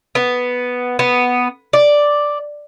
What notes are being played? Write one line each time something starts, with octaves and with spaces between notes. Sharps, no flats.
B3
B3
D5